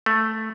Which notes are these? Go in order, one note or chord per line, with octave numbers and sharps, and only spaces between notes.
A3